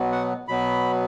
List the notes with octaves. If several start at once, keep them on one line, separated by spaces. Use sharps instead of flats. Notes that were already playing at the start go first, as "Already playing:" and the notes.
Already playing: B2 F#3 B3
F#5
B2 F#3 B3 B5